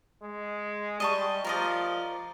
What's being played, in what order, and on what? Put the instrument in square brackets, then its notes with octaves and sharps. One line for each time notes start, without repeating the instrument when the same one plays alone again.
[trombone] G#3
[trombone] G3 [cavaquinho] D#5 A5 C#6
[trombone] F3 [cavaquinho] A#4 D5 D#5